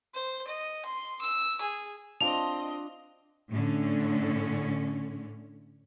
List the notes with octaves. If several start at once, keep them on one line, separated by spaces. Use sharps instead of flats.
C5
D#5
C6
E6
G#4
C4 D4 F4 D#5 C#6 F7
A2 D3 C#4